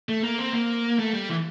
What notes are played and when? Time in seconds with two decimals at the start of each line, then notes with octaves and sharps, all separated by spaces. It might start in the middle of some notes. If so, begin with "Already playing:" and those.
0.09 A3
0.24 A#3
0.38 C4
0.53 A#3
0.99 A3
1.14 G3
1.29 E3